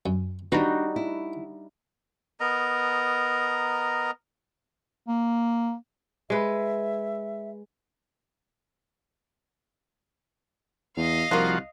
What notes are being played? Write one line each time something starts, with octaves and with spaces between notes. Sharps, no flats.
F#2
D#3 G3 D4 D#4 F#4 B4
E4
B3 A#4 D#5 A#5
A#3
G#3 B4 E5
E2 D#5 F5
C2 F3 A#3 F4 F#4